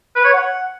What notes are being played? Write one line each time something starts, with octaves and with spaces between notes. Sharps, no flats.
B4
C#5
F#5